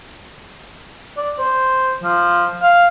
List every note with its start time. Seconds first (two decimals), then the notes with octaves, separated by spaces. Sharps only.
1.17 D5
1.39 C5
2.03 F3
2.62 F5